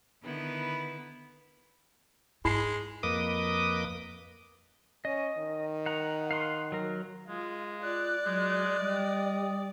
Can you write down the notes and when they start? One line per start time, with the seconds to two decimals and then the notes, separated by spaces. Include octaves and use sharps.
0.23 D3 D#3 B3 E4 B4
2.45 G#2 G#3 E4 A5 C7
3.03 F2 A#3 B4 D#5 D6 D#6
5.05 C#4 D#5
5.38 D#3
5.86 F#5 A#5
6.31 F5 F#5 C6
6.72 F#3 A#4
7.28 G#3 F4
7.82 F4 D5 F#6
8.25 F#3 G#3
8.79 G3 D#5